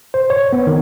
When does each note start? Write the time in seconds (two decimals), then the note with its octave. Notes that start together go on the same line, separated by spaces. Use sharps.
0.14 C5
0.30 C#5
0.53 B3
0.67 D#3